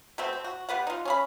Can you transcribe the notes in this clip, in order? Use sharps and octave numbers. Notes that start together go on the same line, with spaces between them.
B2 A3 C4
C4
F#4
G3 B3 B4 F#5
D#4 F4
C#4 G#4 B5